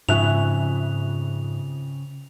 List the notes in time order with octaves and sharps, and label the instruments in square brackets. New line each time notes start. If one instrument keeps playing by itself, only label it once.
[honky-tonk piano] F2 E5 F#6 [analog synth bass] G#2 [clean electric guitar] C#3 [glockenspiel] F7